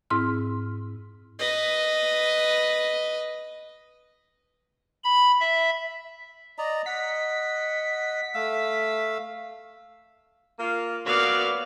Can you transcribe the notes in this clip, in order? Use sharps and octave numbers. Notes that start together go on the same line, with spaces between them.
G#2 C4 E4 C6 F6
B4 D#5
B5
E5
D5 D#5 A#5
D#5 F#5 B6
A3 F5 E6
A#3 F4
F#3 A#3 B3 D5 F5